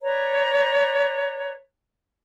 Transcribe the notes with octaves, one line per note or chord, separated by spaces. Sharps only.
B4 C#5 D5 A#5